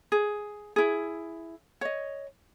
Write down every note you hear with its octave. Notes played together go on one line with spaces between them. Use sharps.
G#4
E4 G#4
C#5 D#5